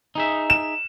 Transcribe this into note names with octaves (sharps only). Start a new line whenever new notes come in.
D#4 G#4 E5
E7